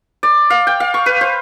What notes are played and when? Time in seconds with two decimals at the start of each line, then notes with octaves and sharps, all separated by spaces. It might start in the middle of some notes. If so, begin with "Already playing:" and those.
0.23 D5
0.50 F5
0.67 G5
0.80 F5
0.94 C#6
1.06 B4
1.21 C5